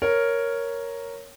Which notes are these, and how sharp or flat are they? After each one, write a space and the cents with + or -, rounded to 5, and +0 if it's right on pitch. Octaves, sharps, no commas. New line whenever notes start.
A#4 +0 C#5 +0